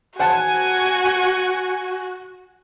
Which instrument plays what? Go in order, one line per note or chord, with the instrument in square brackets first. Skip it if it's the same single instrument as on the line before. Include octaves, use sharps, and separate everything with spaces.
[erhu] F#4 [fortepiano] C5 F#5 A5 [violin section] G#5